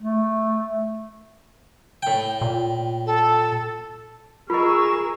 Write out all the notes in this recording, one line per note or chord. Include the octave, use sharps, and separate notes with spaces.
A3
A2 G5
A#2
A4
F4 G#4 A#4 D#5 C#6 E6